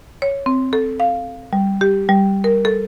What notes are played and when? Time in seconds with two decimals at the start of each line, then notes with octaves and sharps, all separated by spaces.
0.22 C#5
0.46 C4
0.73 A4
1.00 F5
1.53 G3
1.81 G4
2.09 G3
2.44 A#4
2.65 A4